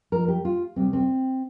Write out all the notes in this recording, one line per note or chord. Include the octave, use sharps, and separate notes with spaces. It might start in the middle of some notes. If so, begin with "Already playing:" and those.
F2 F3 A#4
G4
F4
D2 C3 G3 C4
C4